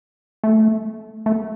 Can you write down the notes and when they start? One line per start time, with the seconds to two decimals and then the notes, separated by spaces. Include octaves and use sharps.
0.44 A3
1.26 A3